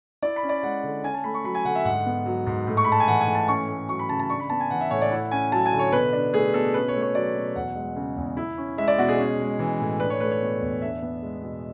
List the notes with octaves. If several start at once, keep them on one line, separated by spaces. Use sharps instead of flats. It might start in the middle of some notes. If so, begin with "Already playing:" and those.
E4 D5
B5
C#4
D5
G#3 F#5
D3
C#4 G#5
A5
A3 B5
C#6
F#3 B5
G#5
D3 F#5
E5
G#2 F#5
B3
F#3
G#2
A2
C#6
B5
G#3 A5
G#5
E3 F#5
G#5
A2
A5
C#4 C#6
A3
F#3 C#6
B5
C#3 A5
A5
D4 C#6
B5
B3 A5
G#5
E3 F#5
E5
A2 C#5
D5
E4 F#5
C#4 G#5
F#3 A5
G#5
D3
C#5
B2 B4
D4
A3 G#4
B2 A4
C#4 B4
C#5
A3
C#5
F#3 D5
B2
E2 F#5
G#3
C#3
E2
E4
C#4
G#3 E5
D5
B2 F#4
G#4
C#4
G#3
E3
A2
D4 B4
C#5
A3 B4
C#5
B2
E2
D4 E5
B3
G#3
B2